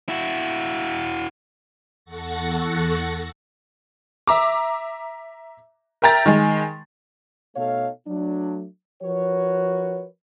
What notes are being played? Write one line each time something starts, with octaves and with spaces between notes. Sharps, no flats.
E4 F#4
E2 A4 F#5 C#6 A6 A#6
E5 A#5 D6
A#4 E5 G5 A#5 A6
D#3 G#3
B2 A3 D#4 A4 C#5 F5
F#3 A3 D4
F3 F#4 A#4 B4 C#5